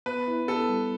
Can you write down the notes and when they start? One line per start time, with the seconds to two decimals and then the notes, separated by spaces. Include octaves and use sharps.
0.06 B3 B4
0.28 E4
0.48 B3 A4
0.69 G3